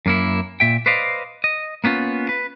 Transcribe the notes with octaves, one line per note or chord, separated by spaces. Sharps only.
F#2 A#3 E4
A#2 E5 G5
B4 C5 D5 D#5 F5
D#5
A#3 B3 C#4 F4
B4